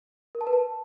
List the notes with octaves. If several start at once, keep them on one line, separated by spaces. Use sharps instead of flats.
A#4
A5
B4
A5